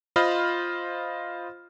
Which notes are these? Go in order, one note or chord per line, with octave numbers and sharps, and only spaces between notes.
F4 C5 D#5 B5 F6